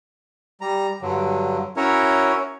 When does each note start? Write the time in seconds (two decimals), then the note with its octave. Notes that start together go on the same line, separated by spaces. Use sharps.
0.61 G3 A#5
1.02 G2 D3 F#3
1.77 C#4 E4 F#4 A#4 C#5